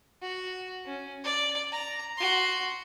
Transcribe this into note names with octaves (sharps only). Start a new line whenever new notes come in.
F#4
C#4
D5
A#5
F#4 C6